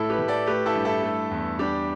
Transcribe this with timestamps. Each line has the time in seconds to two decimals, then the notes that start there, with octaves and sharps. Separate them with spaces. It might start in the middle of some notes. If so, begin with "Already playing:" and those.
Already playing: A2 E4 A4
0.09 G4 B4
0.19 A2
0.28 A4 D5
0.46 A3 G4 B4
0.66 E4 A4
0.75 G2
0.85 E4 A4
1.03 A3
1.31 E2
1.59 G3 D4 G4